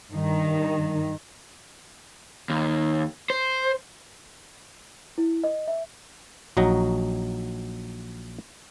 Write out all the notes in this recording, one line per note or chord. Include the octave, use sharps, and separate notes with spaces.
G2 D#3
D#2
C5
E4
D#5
E5
A#1 F#3 D#4 F#4 A#5